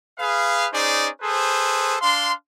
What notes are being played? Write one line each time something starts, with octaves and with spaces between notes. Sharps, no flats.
G#4 B4 F5
C#4 D#4 G#4 C5 D5
G#4 A4 B4 C5
D4 F5 C6